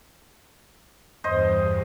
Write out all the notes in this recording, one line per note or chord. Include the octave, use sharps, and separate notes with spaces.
E2 G2 C5 D#5